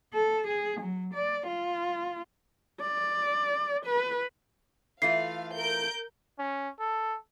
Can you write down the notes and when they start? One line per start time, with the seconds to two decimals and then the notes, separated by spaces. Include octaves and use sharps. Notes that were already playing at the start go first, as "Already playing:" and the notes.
0.14 A4
0.47 G#4
0.80 F#3
1.14 D5
1.47 F4
2.81 D5
3.86 B4
5.02 E3 A3 F4 F5 C7
5.55 A#4 G6 D7
6.39 C#4
6.80 A4